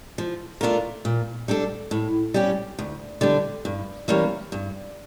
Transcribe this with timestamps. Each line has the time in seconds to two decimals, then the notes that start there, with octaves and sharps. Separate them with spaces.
0.18 F3
0.61 A3 D4 F4 A#4
1.05 A#2
1.48 G3 D4 A4
1.91 A2
2.34 G3 C#4 G4
2.79 D2
3.21 D3 G3 D4
3.65 G2
4.08 E3 G3 A#3 C#4
4.52 G2